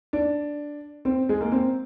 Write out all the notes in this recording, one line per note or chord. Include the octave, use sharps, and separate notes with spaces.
D4
C4
G#3
A#3
C4